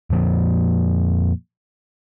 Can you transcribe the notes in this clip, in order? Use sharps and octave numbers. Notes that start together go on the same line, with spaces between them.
F2 A#2 F3 A#3